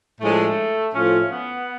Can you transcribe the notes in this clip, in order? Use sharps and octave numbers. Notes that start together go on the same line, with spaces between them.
A2 F3 G#3 A3 D4
A2 F3 A3 C#4 F4
B3